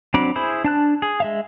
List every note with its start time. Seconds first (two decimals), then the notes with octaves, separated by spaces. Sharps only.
0.14 F#3 C4 D4 B5 D6
0.36 E4 G#4 C5 B5
0.64 D4 A5 F#6
1.02 G#4
1.20 G#3 E5 F5